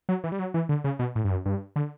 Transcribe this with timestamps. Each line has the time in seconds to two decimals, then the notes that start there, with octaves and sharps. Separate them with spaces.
0.09 F#3
0.24 E3
0.32 G3
0.39 F#3
0.54 E3
0.69 D3
0.84 C#3
0.99 B2
1.15 A2
1.24 G2
1.30 F#2
1.46 G2
1.76 D3